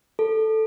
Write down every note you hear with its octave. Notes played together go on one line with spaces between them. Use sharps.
A4